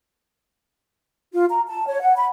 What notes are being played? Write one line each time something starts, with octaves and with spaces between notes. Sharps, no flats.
F4
A#5
A5
C#5
F#5
B5